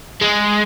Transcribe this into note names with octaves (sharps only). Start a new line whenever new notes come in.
G#3